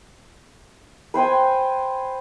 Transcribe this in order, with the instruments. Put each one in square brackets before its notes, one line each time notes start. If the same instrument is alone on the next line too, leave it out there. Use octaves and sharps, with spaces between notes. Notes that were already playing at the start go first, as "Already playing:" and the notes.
[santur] B4 C5 G5 G#5